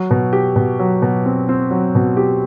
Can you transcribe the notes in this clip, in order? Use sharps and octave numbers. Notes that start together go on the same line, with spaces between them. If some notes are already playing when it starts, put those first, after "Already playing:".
Already playing: F#3
B2
G4
B2
F#3
B2
C4
C4
F#3
B2
G4